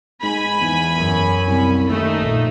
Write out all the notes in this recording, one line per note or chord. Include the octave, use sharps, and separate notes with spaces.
G#2 G#5 B5
E2
F#2 C#4
C2
D#2 A3 D#4
A#1